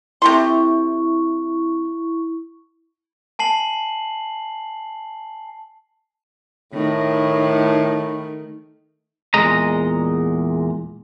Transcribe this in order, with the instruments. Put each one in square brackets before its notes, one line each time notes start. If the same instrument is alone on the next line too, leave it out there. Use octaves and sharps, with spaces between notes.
[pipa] C3 A3 C6 [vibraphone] E4 C#6
[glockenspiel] G#5 A5 C7 F#7
[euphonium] A2 [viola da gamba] D#3 A3
[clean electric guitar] E2 A#2 G#3 D#5 A#5